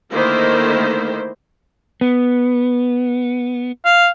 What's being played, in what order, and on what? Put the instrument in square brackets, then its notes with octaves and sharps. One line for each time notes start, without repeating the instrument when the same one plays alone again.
[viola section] D3 D#3 A3 A#3 E4 C5
[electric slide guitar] B3
[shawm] F5